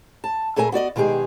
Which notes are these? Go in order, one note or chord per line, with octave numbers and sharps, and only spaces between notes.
A5
A#2 A3 G#4 A#4 G#5
B3 F#4 D5 D#5
B2 D#3 G#3 G4 G#4